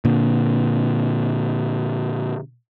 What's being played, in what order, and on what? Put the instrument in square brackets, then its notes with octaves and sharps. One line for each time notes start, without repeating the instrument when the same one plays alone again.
[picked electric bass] A#2 D3